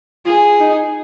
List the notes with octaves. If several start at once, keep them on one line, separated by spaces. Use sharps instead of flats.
F4 G#4
D#4